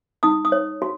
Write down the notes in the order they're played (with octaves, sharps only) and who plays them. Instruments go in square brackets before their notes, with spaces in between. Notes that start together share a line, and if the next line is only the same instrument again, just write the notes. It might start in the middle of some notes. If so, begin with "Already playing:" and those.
[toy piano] D#4 D#6
D#6
C#5
F#4